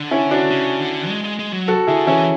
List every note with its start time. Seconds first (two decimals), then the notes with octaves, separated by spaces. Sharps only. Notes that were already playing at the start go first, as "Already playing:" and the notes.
Already playing: D3
0.11 C#4 E4
0.31 D4 F#4
0.51 C#3
0.80 D3
1.09 G#3
1.24 G#3
1.39 G#3
1.53 F#3
1.68 F#4 A4
1.87 D3 E4 G#4
2.07 E3 C#4 E4